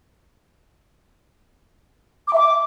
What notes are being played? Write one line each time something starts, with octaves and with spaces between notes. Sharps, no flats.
D6
E5
D6